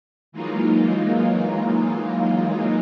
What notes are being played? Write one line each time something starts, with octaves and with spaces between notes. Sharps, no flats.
E3 F#3 G#3 A#3 D#4 F4